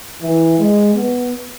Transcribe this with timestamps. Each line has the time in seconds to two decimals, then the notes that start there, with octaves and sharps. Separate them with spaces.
0.22 E3
0.59 G#3
0.95 B3